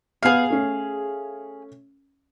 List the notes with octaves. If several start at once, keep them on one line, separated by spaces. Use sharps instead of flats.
B3 G#4 F5 C7
A3 C#4